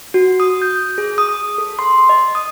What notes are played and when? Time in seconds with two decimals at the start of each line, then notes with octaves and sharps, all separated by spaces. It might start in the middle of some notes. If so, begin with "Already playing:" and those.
0.14 F#4
0.40 D#6
0.62 G6
0.98 G#4
1.18 D#6
1.58 A4
1.79 C6
2.09 D#5
2.35 D#6